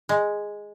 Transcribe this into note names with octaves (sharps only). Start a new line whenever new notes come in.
G#3